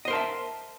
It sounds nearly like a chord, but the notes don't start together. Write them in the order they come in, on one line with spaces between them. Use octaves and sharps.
D#5 C5 A#4 A5 E5